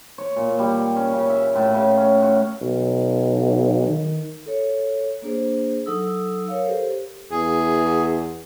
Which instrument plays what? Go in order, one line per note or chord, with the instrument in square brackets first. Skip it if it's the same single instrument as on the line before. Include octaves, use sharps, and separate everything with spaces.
[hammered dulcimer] C#5
A#2
G3
C#4
C#3
E5
A2
C#3
C#4
F#4
[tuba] B1
D#3
[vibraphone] A4 C#5
A#3 D4 G#4 C5
F#3 D#4 A4 D#6 E6
A#4 C#5 F5
G4 A4 C5
[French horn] E2 [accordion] G#4